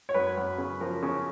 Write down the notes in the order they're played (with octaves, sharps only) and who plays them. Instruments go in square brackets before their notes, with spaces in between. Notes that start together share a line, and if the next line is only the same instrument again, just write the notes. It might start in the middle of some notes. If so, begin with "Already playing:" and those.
[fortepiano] C#5
F#2 B4
F#2
C#3
F3 A#4
C#3